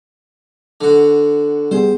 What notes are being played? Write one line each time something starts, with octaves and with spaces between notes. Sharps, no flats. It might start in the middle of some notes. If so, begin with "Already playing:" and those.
D3 F#4
G3 B3 G#4 C5